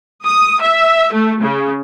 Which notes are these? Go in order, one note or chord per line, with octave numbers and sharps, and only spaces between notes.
D#6
E5
A3
C#3